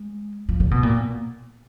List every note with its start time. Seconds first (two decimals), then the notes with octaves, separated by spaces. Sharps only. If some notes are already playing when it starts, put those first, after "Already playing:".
Already playing: G#3
0.49 F3
0.60 C#3
0.71 B2
0.83 A#2